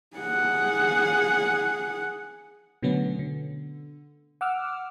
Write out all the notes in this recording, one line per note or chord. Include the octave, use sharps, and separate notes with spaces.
G#4 F#5
B2 D3 F#3 A3 B3 C#4
D3
F#5 D6 E6 F6